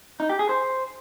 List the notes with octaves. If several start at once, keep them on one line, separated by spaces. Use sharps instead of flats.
D#4
G4
G#4
C5